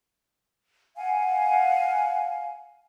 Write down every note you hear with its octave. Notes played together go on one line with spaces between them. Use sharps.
F5 F#5 G#5